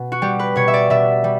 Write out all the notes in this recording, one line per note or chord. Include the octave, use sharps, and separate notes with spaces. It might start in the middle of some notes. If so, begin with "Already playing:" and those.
Already playing: B2
F#4
G3 G4
B4
B2 C#5
E5
D5
B2 E5
G3